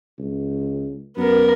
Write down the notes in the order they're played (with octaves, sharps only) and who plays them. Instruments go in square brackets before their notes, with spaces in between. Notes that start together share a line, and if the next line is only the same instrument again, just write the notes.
[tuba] C#2
[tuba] F#2 [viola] B3 A#4